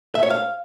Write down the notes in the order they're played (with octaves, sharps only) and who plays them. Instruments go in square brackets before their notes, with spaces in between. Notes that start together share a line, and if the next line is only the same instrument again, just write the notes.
[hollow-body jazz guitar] E5
C#5
F5